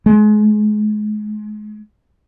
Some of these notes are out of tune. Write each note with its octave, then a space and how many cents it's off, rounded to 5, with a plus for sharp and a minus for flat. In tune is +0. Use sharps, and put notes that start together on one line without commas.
G#3 +35